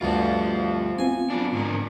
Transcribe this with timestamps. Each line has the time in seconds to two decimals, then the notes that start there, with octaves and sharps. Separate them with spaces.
0.01 D2 G2 D3 C4 F4
0.99 B3 C4 F4 G#5
1.30 F#2 D4
1.53 G#2 D3 A#4